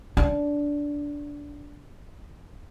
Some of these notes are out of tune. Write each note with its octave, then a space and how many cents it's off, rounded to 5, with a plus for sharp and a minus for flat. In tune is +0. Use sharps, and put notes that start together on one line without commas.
D4 -15